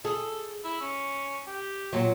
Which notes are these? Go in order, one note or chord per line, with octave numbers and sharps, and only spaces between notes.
G#4 A4
E4
C#4
G4
A#2 F#3